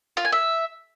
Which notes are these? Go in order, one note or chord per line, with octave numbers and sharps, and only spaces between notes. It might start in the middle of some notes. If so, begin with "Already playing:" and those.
F4
G#5
E5